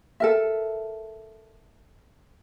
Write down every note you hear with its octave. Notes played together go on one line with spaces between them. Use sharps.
A4 A#4 E5